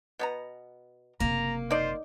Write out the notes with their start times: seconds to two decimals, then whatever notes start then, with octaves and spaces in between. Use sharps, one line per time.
0.19 B2 B3 A#5
1.20 F#1 C3 A#3 A#5
1.70 D#4 F4 C5 D5